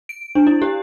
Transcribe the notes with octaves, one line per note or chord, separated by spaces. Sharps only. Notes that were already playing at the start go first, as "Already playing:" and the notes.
D7
D4
E4
G4